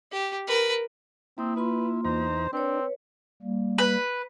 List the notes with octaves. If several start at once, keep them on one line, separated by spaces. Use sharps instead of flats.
G4
A#4 B4
A#3 C4 E4 D#6
A#3 F4 B4 C6
E2 D#4 C5 A#5
C4 D4 B4 C#5
G3 A#3
B4